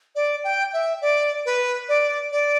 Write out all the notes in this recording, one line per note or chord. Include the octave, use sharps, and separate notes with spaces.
D5
G5
E5
D5
B4
D5
D5